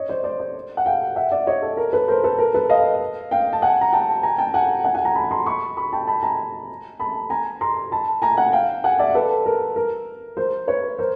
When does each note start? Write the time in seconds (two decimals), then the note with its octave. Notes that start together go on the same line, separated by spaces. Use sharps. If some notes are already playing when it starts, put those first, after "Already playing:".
Already playing: C#5 D#5
0.09 C5 D5
0.24 C5 D5
0.40 C5 D5
0.77 F#5
0.86 F5 G5
1.16 E5 F#5
1.32 D5 E5
1.47 C#5 D#5
1.62 A4
1.77 A#4
1.93 A4 B4
2.08 A#4 C5
2.24 A4 B4
2.38 A#4
2.54 A4 B4
2.69 D#5 F5
3.31 F5 G5
3.53 A5
3.62 F#5 G#5
3.81 A#5
3.93 G5 A5
4.23 G#5 A#5
4.38 G5 A5
4.54 F#5 G#5
4.84 F#5 G#5
4.95 F#5 G#5
5.05 G#5 A#5
5.15 A5 B5
5.31 A#5 C6
5.46 B5 C#6
5.77 B5 C#6
5.92 G5 A5
6.07 A5 B5
6.23 G#5 A#5
7.00 A5 B5
7.30 G#5 A#5
7.61 A#5 C6
7.92 A5 B5
8.22 G#5 A#5
8.37 F#5 G#5
8.53 F5 G5
8.84 F#5 G#5
8.99 D5 E5
9.15 A4 B4
9.46 A#4
9.76 A#4
10.37 A#4 C5
10.67 B4 C#5
10.99 A#4 C5